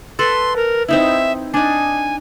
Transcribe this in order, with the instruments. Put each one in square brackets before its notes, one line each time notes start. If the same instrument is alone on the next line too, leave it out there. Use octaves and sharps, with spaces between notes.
[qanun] A4 B4 [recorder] C6
[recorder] A#4
[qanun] C4 D#4 E4 [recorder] E5
[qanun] D4 D#4 [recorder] G#5